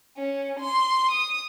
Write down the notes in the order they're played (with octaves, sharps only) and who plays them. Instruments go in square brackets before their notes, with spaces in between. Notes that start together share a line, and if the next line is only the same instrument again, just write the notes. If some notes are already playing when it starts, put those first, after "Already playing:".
[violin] C#4
C6
D#6